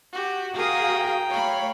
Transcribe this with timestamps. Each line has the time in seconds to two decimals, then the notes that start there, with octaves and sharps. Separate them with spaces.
0.12 F#4 G4
0.55 F#4 G#4 A#4 F5 G5 A#5 D#6
1.30 A3 C#5 F5 B5